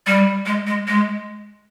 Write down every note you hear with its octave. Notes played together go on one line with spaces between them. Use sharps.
G3
G#3
G#3
G#3